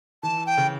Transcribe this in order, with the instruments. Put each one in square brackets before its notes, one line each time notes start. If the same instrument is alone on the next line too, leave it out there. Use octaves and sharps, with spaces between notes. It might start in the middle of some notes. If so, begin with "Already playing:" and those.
[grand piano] E3 [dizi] A5
[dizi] G5
[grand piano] C#3